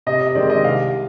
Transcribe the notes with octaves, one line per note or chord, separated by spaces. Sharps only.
C3 D#5
D#5
D#3 G#3 C4 D5
D#5
C2 F5